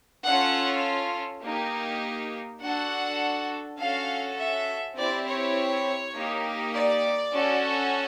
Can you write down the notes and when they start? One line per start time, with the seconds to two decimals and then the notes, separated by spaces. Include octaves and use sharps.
0.24 C#4 F4 A4 F#5
1.42 A#3 D#4 G4
2.61 D4 F#4 A4 F#5
3.78 C#4 F#4 A4 F5
4.38 E5
4.97 C4 E4 G4 D5
5.26 C#5
6.15 A#3 D#4 G4
6.74 D5
7.32 C#4 F#4 A4